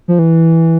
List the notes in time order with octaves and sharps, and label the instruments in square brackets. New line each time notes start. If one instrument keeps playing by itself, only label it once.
[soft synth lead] F3
E3